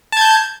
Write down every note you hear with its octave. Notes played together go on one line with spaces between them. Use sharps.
A5 G6 G#6